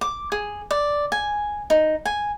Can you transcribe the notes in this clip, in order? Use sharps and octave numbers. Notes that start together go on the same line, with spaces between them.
D6
G#4
D5
G#5
D#4
G#5